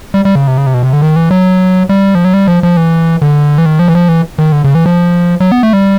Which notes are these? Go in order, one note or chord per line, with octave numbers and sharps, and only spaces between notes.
G3
G3
C#3
C3
C#3
C3
B2
C3
D3
D#3
E3
F#3
G3
F3
F#3
G3
F3
F3
E3
D3
E3
D#3
F3
E3
F3
E3
D#3
D3
C#3
E3
F3
F#3
B3
A3
G3